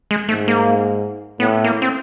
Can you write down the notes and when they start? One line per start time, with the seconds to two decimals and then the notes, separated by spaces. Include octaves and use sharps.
0.11 G#3
0.29 G#2 A3
0.48 A#3
1.40 A2 B3
1.64 A#3
1.82 C4